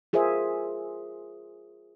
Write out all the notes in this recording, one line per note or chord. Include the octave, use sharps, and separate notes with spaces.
F4 G#4 A#4 C5 E5